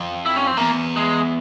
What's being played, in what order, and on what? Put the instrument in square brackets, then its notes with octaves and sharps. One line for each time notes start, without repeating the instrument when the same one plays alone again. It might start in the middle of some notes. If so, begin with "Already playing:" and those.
Already playing: [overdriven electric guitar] F2
[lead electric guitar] E4
C#4
C4
[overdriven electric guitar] E2 [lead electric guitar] A#3
[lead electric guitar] G#3